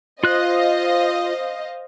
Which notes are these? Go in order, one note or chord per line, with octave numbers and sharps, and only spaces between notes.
F4 C5 D#5 F5 F#6